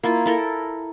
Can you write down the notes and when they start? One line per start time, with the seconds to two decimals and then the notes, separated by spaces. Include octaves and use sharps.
0.03 A#3 E4 F4
0.26 E4 A4 A#4